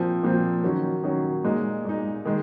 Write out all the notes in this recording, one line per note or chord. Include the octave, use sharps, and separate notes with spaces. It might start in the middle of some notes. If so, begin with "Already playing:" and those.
Already playing: A#2 F3 C4
A#2 F3 C4
D#3 F#3 C#4
D#3 F#3 C#4
A#2 G#3 D#4
A#2 G#3 D#4
D#3 G#3